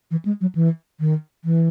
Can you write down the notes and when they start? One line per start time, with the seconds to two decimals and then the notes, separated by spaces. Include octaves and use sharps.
0.11 E3
0.25 G#3
0.41 F#3
0.55 E3
1.00 D#3
1.44 E3